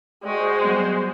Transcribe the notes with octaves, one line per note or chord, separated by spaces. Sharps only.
G#3 F#4 G#4 C5 D5 G5 C#6
F#3 G3 B3